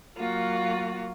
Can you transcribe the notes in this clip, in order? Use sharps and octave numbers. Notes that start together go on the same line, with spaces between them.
F#3 A#3 F4 F#4